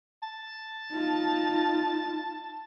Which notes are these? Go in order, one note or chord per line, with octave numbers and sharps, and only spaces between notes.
A5
D#4 F4